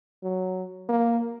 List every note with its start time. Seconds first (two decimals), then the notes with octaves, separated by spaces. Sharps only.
0.24 F#3
0.89 A#3